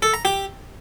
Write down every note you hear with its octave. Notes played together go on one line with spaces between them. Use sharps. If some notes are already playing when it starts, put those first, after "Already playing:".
A4
A#5
G4